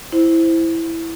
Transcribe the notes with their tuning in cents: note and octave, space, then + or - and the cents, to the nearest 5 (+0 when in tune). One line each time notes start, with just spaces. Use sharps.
E4 +0 C5 +0